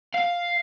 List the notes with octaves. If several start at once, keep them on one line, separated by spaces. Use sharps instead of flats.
F5